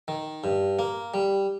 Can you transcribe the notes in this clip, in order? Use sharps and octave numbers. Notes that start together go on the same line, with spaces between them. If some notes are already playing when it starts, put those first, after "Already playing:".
D#3
G2
A#3
G3